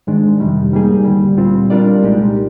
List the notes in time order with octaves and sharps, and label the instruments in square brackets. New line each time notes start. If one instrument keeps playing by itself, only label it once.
[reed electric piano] G#2 D#3 G#3 D4
F2 C3 D#3 G3
G#2 G3 A#3 D#4 G#4
D2 D3 G3
A#2 G3 C4 F4
G3 D4 F4 A#4 D5
C2 A#2 G#3 D#4 G4